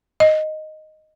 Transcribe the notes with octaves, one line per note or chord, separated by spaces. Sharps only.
D#5